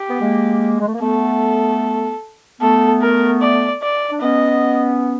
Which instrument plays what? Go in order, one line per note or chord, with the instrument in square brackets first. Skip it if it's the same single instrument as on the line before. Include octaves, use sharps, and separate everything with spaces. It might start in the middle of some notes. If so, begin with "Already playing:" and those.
Already playing: [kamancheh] G4
[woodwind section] B3
G#3 A#3
G#3
A3
A#3
[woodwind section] A3 B3 [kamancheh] A4
[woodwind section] A3 B3 [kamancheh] A4
[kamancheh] A#4
D5
D5
[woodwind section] D4
[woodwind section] B3 C#4 [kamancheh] D#5